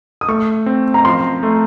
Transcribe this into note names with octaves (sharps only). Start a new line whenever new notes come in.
D#6
A3 C#6
C4
A#5
F3 C6
A3